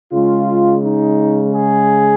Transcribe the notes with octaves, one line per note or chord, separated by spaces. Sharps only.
C#3 G#3 F4
D#4
G#4